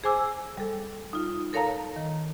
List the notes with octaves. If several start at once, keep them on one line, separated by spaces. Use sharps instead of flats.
G#4 C5 G#5 D6 E6
G3 A4
D#4 F4
A4 A#4 C#5 F5 A5 A#5
D#3